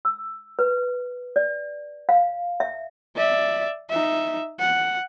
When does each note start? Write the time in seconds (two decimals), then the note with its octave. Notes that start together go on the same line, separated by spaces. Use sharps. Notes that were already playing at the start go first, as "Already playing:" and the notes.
0.05 E6
0.59 B4
1.36 D5
2.09 F5
2.60 E5
3.16 D5 E5
3.89 D#4 E5
4.59 F#5